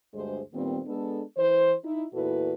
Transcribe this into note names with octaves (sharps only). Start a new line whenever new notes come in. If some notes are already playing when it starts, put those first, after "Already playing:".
D2 G2 G#3 G#4 C5
A#2 D#3 G3 B3 C4
G#3 B3 D4 A4
E3 C5
D#4 E4
E2 A#2 E4 F#4 A4 B4